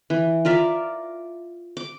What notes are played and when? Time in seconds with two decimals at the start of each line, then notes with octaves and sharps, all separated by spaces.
0.10 E3
0.45 F4 A#4 D5 E5
1.77 D6